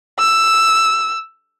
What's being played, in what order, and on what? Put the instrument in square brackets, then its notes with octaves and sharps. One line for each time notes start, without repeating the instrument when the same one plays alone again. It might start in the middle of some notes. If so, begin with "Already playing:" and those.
[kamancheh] E6